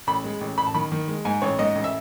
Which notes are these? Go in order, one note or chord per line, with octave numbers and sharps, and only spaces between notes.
A1 B5
G#3
A1
A1 B5
A5
D#3 B5
D#3
G#3
G#2 G#5
A1 C#5
G#2 D#5
A1
E5